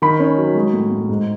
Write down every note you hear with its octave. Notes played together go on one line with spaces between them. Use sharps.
D#3 B5
C#4
F#3
G#3
A2
A2
G#2